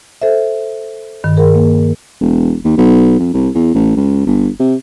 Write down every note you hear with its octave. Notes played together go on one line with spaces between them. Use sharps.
A4 C5 E5
G2 D#3
G#4 A#4
A#3
E1
D#2
B1
F2
C2
E2
A1
C#2
G1
C3